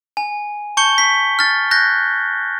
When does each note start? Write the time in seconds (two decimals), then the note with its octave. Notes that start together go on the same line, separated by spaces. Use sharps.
0.17 G#5
0.77 A5 C#6 G6 C#7 G7
0.98 B6
1.39 F6 A6
1.71 F#6 G6 A#6